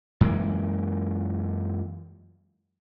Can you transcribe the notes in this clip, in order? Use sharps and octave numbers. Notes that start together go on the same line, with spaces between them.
F#2 E3 G#3 A#3